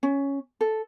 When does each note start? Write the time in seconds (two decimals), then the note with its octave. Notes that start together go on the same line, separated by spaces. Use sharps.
0.03 C#4
0.61 A4